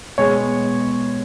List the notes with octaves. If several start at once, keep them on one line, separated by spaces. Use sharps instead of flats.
B2 G#3 B3 C#5